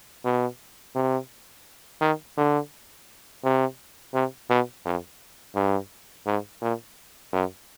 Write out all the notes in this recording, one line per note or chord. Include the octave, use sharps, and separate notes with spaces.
B2
C3
D#3
D3
C3
C3
B2
F2
G2
G#2
A#2
F#2